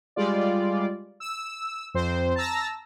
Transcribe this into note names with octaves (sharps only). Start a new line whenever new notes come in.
G3 G#3 F4 D5
E6
F2 C4 C5
A5 A#5 E6 A#6